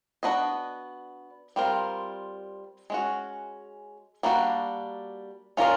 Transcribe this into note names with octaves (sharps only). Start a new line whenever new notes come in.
B3 D4 F#4 B4 D#5
G3 C4 F4 A#4
G#3 C#4 F#4
G3 A#3 D4 F#4
C#4 F4 A#4 D5